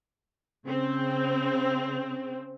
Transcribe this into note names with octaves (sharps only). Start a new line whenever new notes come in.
C#3 C4